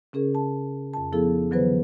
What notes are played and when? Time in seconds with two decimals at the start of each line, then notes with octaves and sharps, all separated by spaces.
0.13 C#3 C#4 G#4 A#4
0.35 A5
0.93 F2 A5
1.12 F3 B3 E4 G#4 A4
1.51 D3 E3 F#3 B3 B4 C5